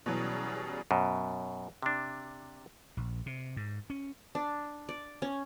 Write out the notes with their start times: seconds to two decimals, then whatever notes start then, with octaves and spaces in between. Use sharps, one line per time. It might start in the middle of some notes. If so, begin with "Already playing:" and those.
0.06 B2 E3 F#3 G3 C#4 G#4
0.91 F#2 B2
1.83 C3 D4
2.97 A#1
3.26 C3
3.57 G#2
3.90 C#4
4.35 D4
4.89 D5
5.22 C#4